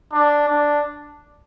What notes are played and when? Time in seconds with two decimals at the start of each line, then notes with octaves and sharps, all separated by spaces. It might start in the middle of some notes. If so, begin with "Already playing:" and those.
0.12 D4
0.48 D4